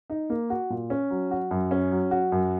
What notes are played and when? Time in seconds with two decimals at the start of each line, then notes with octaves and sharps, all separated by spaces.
0.10 D#4
0.30 A#3
0.50 F#4
0.70 A#2
0.90 C#4
1.10 F#3
1.31 F#4
1.51 F#2
1.71 C#4
1.92 F#3
2.11 F#4
2.32 F#2